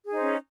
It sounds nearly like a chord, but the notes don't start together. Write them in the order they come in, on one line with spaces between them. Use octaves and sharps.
G#4 D#4 C5 C#4